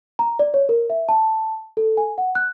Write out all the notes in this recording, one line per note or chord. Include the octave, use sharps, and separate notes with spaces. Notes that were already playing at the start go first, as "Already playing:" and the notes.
A#5
D5
C#5
A#4
E5
A5
A4
G#5
F#5
F#6